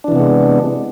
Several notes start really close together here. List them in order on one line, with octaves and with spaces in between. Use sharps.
D4 E3 C3 B3 G#3